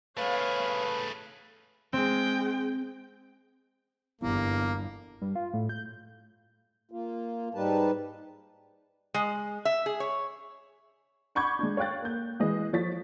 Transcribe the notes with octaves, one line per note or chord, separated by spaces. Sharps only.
A3 G#4 B4 C#5 F5
G#3 C4 G5
G1 E2 G2 A#3
G2
F4
A2
G6
A#3 F4
G#2 G3 D#4 G4 B4 A5
G#3
E5
G#4
C#5
F#5 B5 C#6 D6 G6 G#6
G#3 D4
C#5 F5 G5 F#6 A6
A#3 G6
E3 G#3 D#5
F3 C#5 A6 B6